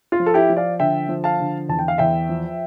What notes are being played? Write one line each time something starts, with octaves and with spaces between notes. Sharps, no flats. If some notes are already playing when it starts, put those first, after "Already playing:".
F4
F3
A4
E4 G4
F3
D5 F5
D3 E5 G5
F3
F5 A5
D3
E2 A5
G5
F5
E2 E5 G5
F3